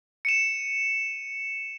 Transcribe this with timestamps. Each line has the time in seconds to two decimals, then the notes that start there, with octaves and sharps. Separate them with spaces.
0.25 C#7 D#7 E7